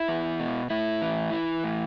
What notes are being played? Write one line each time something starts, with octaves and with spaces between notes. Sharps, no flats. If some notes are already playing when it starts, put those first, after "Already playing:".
Already playing: E4
E2
B2
A2 E4
E3
E3
A2